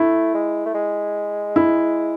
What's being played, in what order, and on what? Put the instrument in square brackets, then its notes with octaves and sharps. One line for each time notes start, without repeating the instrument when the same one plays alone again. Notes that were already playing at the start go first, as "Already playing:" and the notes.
Already playing: [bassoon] A3 [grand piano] E4
[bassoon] G#3
A3
G#3
[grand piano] E4